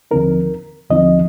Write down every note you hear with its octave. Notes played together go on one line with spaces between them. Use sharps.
D#2 D3 F3 C4 D#4 A#4
D#2 D3 F3 C4 D#4 D#5